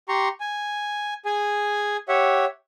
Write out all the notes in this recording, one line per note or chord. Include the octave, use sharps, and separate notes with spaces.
G4 A#5 C6 C#6
G#5
G#4 G#5
G4 C#5 E5 F#5